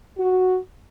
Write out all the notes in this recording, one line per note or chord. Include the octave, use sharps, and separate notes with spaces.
F#4